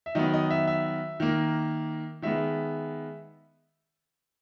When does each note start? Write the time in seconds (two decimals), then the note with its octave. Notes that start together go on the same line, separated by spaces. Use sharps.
0.06 E5
0.15 D#3 F#3 B3 D#5
0.34 D#5
0.50 E5
0.67 E5
1.20 D#3 A#3
2.22 D#3 G#3 B3 E5